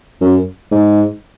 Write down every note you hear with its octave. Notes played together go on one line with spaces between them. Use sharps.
F#2
G#2